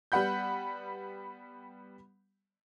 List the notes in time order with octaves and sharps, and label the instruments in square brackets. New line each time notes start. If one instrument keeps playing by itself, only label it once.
[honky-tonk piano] G3 B3 F#5 B5 G6